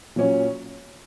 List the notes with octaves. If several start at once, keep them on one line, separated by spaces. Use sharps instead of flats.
A#2 F#3 C#4